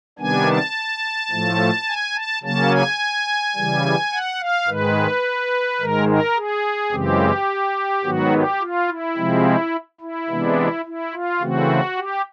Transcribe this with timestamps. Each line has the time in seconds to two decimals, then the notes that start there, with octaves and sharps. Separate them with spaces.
0.19 C3 D#3 G3 B3 D4 G#5
0.47 A5
1.31 A2 F3 A3
1.87 G#5
2.16 A5
2.43 C#3 F#3 A#3 C#4 A5
2.72 G#5
3.56 C#3 E3 G3
4.12 F#5
4.40 F5
4.68 G#2 D#3 G#3 B4
5.80 G#2 D#3 G#3 A#4
6.08 A#4
6.36 G#4
6.92 F#2 C#3 E3 G#3 C4 G4
8.04 G#2 D#3 F#3 B3 F#4
8.33 G4
8.60 F4
8.88 E4
9.17 C3 F3 G#3 C4
10.00 E4
10.29 C3 E3 G#3 B3 D4
10.85 E4
11.13 F4
11.41 C#3 E3 A3 C4 F#4
11.97 G4